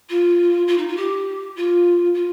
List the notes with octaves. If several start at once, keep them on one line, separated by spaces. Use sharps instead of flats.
F4
F4
D#4
F4
G4
F4
F4